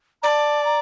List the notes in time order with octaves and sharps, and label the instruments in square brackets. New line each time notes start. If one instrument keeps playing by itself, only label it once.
[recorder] D5 [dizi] A5 A#5
[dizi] A#5